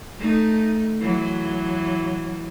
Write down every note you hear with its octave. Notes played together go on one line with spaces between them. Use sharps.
A3 D#4
E3 F#3